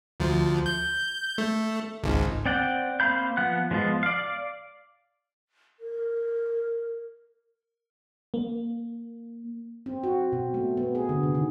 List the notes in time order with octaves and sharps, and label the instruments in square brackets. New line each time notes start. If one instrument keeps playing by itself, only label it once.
[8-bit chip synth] D2 F3
G6
A3
G#1 C#2
[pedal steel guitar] C4 D5 F#5 G5
A#3 C4 F5 B5 G6
F3 B3 F#5 F#6
F3 G#3 B3 F4
D5 F5
[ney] A#4
[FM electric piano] A#3
[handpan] C4
F#4
B2
A3
B3
G#4
D3
C3
D#3